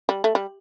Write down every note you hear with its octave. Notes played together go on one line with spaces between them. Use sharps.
G3
A3
G3